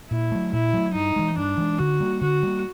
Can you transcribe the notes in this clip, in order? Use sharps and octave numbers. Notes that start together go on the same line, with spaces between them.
A#2 E4
F#3 A3
A#2 E4
F#3 A3
G2 D#4
E3 G#3
G2 D4
E3 G#3
D3 F#4
G3 A#3
D3 F#4
G3 A#3